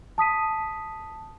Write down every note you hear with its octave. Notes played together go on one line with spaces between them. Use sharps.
A5 D#6 B6 D#7